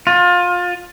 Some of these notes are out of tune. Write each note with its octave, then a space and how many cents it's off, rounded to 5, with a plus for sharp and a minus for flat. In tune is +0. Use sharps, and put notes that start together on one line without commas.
F4 +25